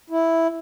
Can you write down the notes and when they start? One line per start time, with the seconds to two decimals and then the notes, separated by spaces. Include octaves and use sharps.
0.10 E4